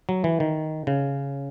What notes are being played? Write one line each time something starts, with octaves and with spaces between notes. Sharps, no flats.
F#3
E3
D#3
C#3